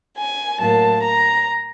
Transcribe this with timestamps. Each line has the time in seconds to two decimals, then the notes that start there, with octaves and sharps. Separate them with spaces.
0.17 G#5
0.59 A2 F#3 A#3 A5
1.02 A#5